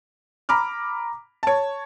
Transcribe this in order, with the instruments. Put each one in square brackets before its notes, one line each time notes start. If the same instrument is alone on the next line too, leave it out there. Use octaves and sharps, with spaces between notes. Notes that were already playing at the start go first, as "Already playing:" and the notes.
[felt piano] A#5 B5 D6 F6
C#5 A5